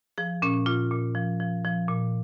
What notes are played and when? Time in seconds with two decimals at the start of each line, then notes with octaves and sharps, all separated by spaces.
0.18 F3 G#4
0.42 A#2 C#4
0.66 A#2 F4
0.91 A#2
1.15 F3
1.40 F3
1.64 F3
1.88 A#2